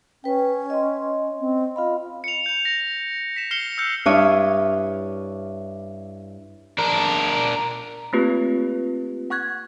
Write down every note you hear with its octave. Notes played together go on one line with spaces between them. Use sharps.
C#4 B4 G5
D#5 C6
C4
F4 D#5 F5 B5
C#7 F7
G6 F7
A#6
B6 E7
F6 C7 C#7 E7 G7
E6 F6 G6 C#7
G2 D4 E4 C#5 D#6 F6
D4 A#4
A3 A#3 C4 F4 G4 B4
F#5 C#6 F#6 G#6